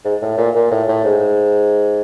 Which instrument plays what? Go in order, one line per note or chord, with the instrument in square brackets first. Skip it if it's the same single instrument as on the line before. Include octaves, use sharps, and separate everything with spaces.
[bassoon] G#2
A2
A#2
A#2
A2
A2
G#2